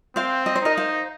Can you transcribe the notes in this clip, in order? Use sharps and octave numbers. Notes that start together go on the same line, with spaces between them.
C4 C5 F5
D#5
C5
D#4 A#4 D#5
C5 F5